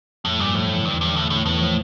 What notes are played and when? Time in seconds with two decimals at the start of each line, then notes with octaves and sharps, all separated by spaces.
0.24 F2 A2 F3
0.39 G2 A#2 G3
0.54 A2 F3
0.68 E3
0.81 G2 D3
0.93 E2 E3
1.01 G2
1.16 A2 D3
1.30 A2 D3
1.46 E2 A2 E3
1.61 F3